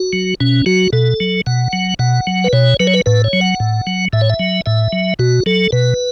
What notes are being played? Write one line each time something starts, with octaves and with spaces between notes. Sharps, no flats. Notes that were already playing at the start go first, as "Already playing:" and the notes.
Already playing: F#4
F#3
B2 C#4
F#3 F#4
B2 A4
F#3
B2 F#5
F#3
B2 F#5
F#3
B4
B2 C#5
F#3 B4
C#5
B4
A2 B4
C#5
F#3
F#5
A2
F#3
A2 E5
C#5
E5
F#3
A2 E5
F#3
B2 F#4
F#3 A4
B2 B4